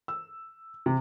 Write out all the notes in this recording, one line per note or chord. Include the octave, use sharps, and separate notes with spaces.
E6
C3